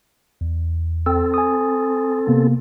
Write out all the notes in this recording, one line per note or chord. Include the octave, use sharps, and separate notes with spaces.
E2
C4 A4
G#5 D#6
C3 A#3 B3